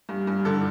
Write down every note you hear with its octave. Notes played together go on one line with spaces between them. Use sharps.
G2
G2
D3 A4